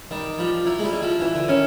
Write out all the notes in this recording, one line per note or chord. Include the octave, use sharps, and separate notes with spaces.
D#3 G3
F3 G3
F#3 E4
G#3
G3
E4
F3
E3 E4
D3
D#3 C#4